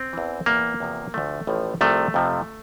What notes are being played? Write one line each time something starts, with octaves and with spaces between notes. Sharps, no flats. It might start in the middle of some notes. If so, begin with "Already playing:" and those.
Already playing: C4
E2 E3
E2 E3 A#3
E2 C3 F3
D2 D3 F3 A3
A1 A2 F3
C2 C3 F3 A3
F2 C3 F3